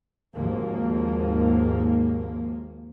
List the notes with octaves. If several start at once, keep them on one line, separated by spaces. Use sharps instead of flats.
G#1 D#2 G#2 F3 A#3